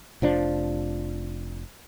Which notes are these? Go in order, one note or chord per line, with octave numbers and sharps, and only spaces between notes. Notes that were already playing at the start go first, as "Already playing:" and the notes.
F1 F3 D4